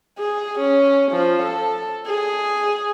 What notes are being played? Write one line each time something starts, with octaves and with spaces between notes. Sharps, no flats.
G#4
C#4
F3
A4
G#4